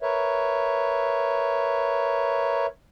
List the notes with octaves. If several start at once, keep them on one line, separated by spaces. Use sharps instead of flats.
A#4 B4 C#5 E5